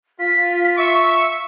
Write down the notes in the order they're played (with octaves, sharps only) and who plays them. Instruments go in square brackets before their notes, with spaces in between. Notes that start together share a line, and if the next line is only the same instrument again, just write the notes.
[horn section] F4 [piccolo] B6
[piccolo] E5 [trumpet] C#6